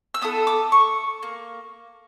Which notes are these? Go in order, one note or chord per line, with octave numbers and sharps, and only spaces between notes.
E6
B3 E4 A4 D#6
D6
C#6
A#3